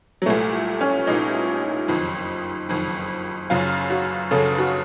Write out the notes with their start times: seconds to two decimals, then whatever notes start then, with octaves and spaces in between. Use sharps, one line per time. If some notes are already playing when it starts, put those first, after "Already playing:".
0.22 F#3
0.26 C2 A#2 A3
0.81 C#4
1.07 C2 A#2 D#4
1.88 F#1 F2 D#3
2.69 F#1 F2 D#3
3.50 F#1 F#2 C#3 F4
3.90 F#4
4.31 F#1 F#2 C#3 A4
4.58 F#4